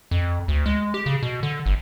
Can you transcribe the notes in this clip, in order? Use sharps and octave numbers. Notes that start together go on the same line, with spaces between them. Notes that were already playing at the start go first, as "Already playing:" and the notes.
F2
D2
G#3
G4
C#3
B2
D3
G1